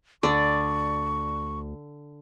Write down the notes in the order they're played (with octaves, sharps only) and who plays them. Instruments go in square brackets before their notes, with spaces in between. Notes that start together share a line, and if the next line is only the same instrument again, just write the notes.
[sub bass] D2 [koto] D3 [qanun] D5 [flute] C#6